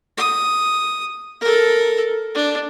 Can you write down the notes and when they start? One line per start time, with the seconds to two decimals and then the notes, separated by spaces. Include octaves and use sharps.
0.17 D#6
1.41 A4 A#4
2.35 D4